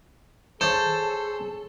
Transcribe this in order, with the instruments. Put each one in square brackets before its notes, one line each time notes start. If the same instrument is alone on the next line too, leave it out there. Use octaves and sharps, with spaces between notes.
[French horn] G#4 [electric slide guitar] A4 [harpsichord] C5 C#5